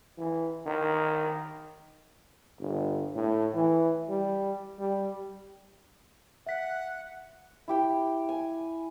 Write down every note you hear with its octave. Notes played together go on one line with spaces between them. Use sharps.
E3
D#3
G1
A2
E3
G3
G3
E5 F#5 B6
E4 G4 G5
G#5